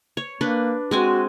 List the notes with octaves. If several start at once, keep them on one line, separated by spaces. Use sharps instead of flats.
C#5
A#3 D4 B4
G#3 C4 F#4 G#5